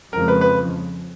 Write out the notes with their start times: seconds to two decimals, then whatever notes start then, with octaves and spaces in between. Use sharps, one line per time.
0.13 F2 C#3 F3 G#3 A#4
0.28 B4
0.41 B4